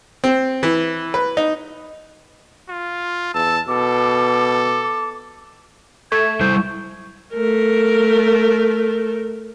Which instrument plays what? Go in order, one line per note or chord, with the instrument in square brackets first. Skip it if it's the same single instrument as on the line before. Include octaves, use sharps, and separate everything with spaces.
[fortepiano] C4
E3
B4
D#4
[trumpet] F4
[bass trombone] E2 [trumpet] A5 [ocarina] E6
[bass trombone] B2 [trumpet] A4 [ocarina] D6
[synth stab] A3 [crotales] C#6 [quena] G#6
[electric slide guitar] G3 E4 C5 [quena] G6
[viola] A3 A#4